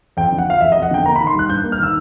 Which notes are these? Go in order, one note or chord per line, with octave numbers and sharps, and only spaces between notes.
F2 G5
D3
F#5
F3 F5
F2 E5
F2 D#5
F#5
D3 G5
A#3 A#5
D#3 B5
C6
G3 F#6
G2 G6
A#3
F6
D#3 E6